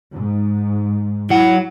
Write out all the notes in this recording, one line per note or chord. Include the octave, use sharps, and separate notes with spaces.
G#2
F#3 E4 F#5